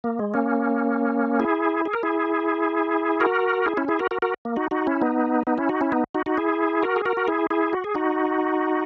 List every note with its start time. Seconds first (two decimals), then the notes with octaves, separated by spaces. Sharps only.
0.04 A#3
0.19 G#3
0.34 A#3 C#4
1.39 E4 G#4
1.86 G#4
1.94 A#4
2.03 E4 G#4
3.20 F#4 A#4
3.66 E4 G#4
3.77 C#4 E4
3.88 E4 G#4
3.99 F#4 A#4
4.11 F#4 A#4
4.22 F#4 A#4
4.45 A#3
4.56 D#4 F#4
4.71 D#4 F#4
4.87 C#4 E4
5.01 B3 D#4
5.47 B3 D#4
5.58 C#4 E4
5.69 D#4 F#4
5.81 C#4 E4
5.92 B3 D#4
6.15 D#4 F#4
6.26 D#4 F#4
6.37 E4 G#4
6.83 F#4 A#4
6.96 G#4
7.05 F#4 A#4
7.17 F#4
7.28 E4 G#4
7.50 E4 G#4
7.73 F#4
7.84 G#4
7.95 D#4 F#4